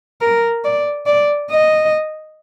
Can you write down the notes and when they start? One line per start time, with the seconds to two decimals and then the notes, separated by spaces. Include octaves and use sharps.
0.21 A#4
0.64 D5
1.06 D5
1.51 D#5